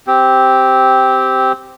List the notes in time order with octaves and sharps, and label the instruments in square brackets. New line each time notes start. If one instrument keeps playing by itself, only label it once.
[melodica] C4 G4